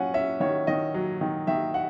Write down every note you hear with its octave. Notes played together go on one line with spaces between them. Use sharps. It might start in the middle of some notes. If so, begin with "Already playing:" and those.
Already playing: F#3 C#4 F#5 G#5
C#4 E5
D#3 C#5
D#3 D#5
F#3
D#3
D#3 E5
F#5